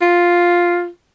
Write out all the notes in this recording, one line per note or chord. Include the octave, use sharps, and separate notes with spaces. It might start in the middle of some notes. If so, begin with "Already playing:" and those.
F4